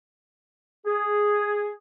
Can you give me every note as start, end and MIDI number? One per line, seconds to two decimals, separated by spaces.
0.86 1.69 68